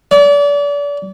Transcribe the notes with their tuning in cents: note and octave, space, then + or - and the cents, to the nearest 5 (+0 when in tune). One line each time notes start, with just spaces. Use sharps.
D5 -35